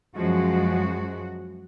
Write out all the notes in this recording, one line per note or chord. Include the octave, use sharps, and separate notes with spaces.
F#2 F3 G#3 F#4